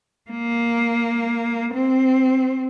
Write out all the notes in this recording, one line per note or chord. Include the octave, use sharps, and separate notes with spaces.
A#3
C4